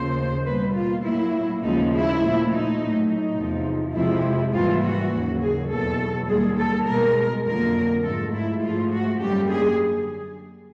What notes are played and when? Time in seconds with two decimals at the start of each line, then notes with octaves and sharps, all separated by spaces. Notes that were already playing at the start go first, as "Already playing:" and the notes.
Already playing: D#2 C#3 F3 A#3 C5
0.45 B2 G3 A#3 B4
0.75 F4
1.03 A2 F#3 A#3 E4
1.62 D#2 C#3 F3 G#3 D#4
1.92 E4
2.20 A#2 F3 A3
2.50 D#4
2.79 A2 F#3 A3
3.08 D#4
3.37 E2 C3 F3
3.95 F2 C3 F3 G#3 E4
4.53 G#2 E3 G3 A#3 F4
4.83 F#4
5.12 D#2 C#3 F#3
5.41 G#4
5.70 E2 B2 F#3 A4
6.28 D#2 D3 G3 A#3 G#4
6.57 A4
6.87 B2 G#3 A#4
7.45 F2 D3 F#3 A#3 A#4
8.03 G#2 F3 A3 A4
8.32 E4
8.62 G#2 F3 A3 F4
8.92 F#4
9.20 F#2 D3 G3 A#3 G4
9.49 G#4